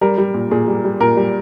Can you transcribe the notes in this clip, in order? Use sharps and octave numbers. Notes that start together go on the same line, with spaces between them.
G3 A#4
G3
A#2
A#2 G#4
G3
G3
A#2 A#4
G3